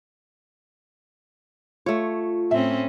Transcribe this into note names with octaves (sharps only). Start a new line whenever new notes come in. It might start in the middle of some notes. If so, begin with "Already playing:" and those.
A3 F4 C#5
A2 C4 C#4 E5